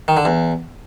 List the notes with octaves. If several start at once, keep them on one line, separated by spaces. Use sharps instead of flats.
D#3
D3
E2